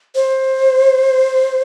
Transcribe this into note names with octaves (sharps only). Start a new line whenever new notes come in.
C5